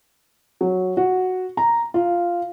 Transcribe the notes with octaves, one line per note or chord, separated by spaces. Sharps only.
F#3
F#4
A#5
F4